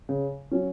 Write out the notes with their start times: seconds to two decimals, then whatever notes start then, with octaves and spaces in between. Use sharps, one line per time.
0.09 C#3
0.51 F#3 C#4